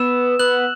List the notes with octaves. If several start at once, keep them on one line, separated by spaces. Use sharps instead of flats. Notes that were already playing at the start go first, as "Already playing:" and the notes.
Already playing: B3 E6 E7
B3 F#6 F#7